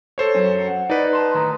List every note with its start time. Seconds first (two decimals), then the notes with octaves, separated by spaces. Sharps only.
0.18 A4 C5 C#5
0.35 F#2 C#4
0.68 F#5
0.90 D#4 B4 D5
1.13 A5 C6
1.34 A2 D#3 A#5